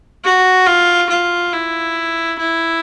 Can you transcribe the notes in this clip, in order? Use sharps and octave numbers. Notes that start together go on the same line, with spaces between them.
F#4
F4
F4
E4
E4